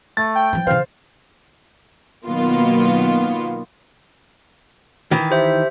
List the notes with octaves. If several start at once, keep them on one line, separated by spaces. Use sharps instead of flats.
A3 A6
G5
E3 F3
C#3 E3 C5 F5
B2 D#3 F#3 A#3 B3 F4
D#3 E3
G4 C5 E5